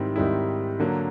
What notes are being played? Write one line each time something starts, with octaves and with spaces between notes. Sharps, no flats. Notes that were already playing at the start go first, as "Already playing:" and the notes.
Already playing: G#2 D#3 G3 C4 E4
G#2 D#3 G3 C4 E4
D3 F#3 A#3